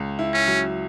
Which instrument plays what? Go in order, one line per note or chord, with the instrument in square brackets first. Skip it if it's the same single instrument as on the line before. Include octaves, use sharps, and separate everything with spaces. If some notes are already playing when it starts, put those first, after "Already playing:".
Already playing: [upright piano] C#2
E4
[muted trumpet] C#4
[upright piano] F#3